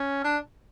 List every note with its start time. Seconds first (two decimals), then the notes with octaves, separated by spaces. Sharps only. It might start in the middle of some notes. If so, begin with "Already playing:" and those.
Already playing: C#4
0.24 D4